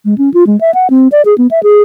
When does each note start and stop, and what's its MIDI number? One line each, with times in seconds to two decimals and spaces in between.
0.05 0.17 56
0.18 0.32 61
0.34 0.46 65
0.47 0.59 56
0.61 0.71 76
0.74 0.87 78
0.90 1.08 60
1.12 1.22 74
1.25 1.36 68
1.38 1.47 59
1.51 1.62 76
1.63 1.82 68